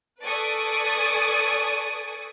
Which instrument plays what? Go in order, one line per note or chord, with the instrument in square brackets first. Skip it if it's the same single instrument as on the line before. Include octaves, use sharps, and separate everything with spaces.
[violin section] A4 B4 D5 G#5 C#6 D#6